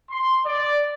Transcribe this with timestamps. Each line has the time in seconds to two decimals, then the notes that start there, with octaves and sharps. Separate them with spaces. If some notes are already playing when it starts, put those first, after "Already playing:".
0.10 C6
0.45 D5